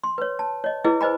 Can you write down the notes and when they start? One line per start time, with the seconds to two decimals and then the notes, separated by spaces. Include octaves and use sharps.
0.04 C6
0.18 B4 C#5
0.39 A5
0.64 C#5 D#5
0.84 E4 G#4 B4 D#5
1.01 B4 C5 D#5 G#5 B5